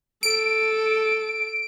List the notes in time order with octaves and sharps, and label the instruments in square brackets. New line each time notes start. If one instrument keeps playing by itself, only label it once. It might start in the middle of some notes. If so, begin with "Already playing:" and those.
[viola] A4 [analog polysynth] D7